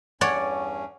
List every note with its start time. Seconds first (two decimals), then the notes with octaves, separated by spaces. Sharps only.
0.21 E2 G2 C#4 C#5 D5 F#5